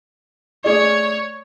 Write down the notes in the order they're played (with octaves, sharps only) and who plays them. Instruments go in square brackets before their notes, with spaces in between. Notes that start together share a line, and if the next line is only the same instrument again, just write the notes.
[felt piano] A3 G#4 D5 [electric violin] C#5